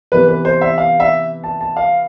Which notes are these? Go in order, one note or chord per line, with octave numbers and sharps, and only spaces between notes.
C3 E3 B3 B4
B4
C5
E5
F5
E5
A5
A5
F5